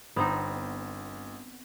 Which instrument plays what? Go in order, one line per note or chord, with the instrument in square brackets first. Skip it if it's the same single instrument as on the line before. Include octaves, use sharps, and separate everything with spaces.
[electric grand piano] G1 [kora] B3 C4 D#4